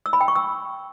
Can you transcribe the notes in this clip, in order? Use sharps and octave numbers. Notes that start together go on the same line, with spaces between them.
E6
B5
G5
C#6
E6